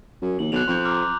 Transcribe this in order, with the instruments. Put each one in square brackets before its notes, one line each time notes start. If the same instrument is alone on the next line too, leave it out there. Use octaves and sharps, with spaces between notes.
[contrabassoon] F#2
[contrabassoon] D#2 [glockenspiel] F#7
[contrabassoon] B1 [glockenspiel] F#6 F7
[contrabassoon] F2 [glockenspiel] C6 G6
[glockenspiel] A#5 D6 F6